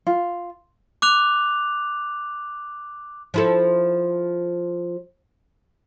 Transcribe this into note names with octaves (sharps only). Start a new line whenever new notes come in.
F4
D6 F#6 F7
F3 E4 A4